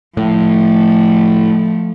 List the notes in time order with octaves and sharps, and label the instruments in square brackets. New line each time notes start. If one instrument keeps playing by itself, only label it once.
[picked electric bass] A2 [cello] F3 A3